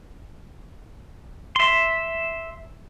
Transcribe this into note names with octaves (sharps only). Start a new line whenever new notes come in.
E5 C6